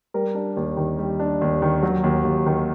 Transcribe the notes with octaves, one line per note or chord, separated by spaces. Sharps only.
G3 A#4
D4
D#2
D#3
G3
D4
D#2
D#3
F#3
D#2
D#2
D#3